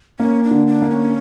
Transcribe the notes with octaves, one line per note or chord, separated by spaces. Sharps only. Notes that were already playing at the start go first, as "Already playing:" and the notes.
A#3 C#4
D4
D3
D4
A#3
C#4